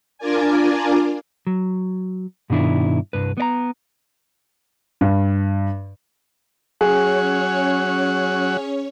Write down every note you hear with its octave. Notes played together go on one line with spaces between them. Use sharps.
D4 F4 A#4 D5 G#5
F#3
G2 B2 D#3 D4 E4
C2 G2 B4
B3 D5 A#5
G2
F#3 C#4 G#4 C#5 F#5